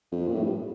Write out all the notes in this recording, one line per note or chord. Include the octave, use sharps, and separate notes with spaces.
F2
A#2
A2
G2